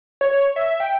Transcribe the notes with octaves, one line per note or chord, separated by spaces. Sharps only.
C#5
E5
G5